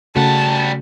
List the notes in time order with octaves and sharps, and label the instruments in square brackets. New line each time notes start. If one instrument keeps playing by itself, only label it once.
[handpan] C#3 A3 F#4 [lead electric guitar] G3 F#5 [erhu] A5